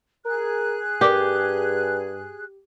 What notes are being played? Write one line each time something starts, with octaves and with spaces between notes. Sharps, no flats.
G#4 A#4 F#6
G2 G4 A#4 D5 D6